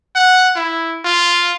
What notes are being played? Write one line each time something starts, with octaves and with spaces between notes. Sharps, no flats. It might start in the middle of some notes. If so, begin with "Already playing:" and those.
F#5
E4
F4